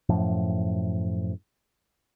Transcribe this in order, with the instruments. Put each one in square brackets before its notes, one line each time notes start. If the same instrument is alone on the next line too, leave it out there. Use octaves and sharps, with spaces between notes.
[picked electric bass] F#2 A2 F3